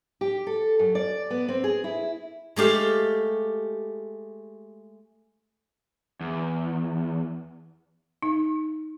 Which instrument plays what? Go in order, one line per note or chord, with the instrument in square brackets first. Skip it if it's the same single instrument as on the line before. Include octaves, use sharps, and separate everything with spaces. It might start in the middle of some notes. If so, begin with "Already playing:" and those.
[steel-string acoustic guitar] G4
A4
F#2
D5
B3
C4
G#4
E4
[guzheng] G#3 A3 G4 F5
[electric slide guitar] E2
[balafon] D#4